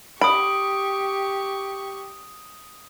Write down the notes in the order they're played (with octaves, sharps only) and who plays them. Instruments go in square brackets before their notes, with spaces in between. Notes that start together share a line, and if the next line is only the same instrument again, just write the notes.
[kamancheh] G4 C#6 [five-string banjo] B5 [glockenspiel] D#6 D7